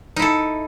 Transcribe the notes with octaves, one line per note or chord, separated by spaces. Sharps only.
D#4 E4 A4